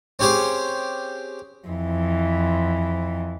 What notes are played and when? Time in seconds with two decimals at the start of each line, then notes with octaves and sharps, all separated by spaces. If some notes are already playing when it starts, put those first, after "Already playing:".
0.19 C4 C#4 G4 G#4 C5
1.68 F2 E3